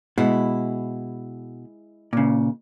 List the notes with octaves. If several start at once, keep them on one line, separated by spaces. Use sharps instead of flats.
B2 G#3 E4
A#2 C#3